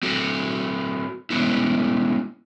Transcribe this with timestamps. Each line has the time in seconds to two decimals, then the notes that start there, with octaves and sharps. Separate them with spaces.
0.03 C4 F#4 A4
1.30 G#3 B3 C#4 E4